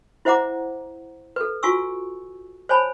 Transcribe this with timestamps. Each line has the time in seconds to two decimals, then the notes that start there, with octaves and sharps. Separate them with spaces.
0.25 E4 C5 E5 F#5 A#5 D6
1.36 A4 B4
1.63 F4 F#4 G#5 C#6 E6
2.69 C5 C#5 G#5 A5 B5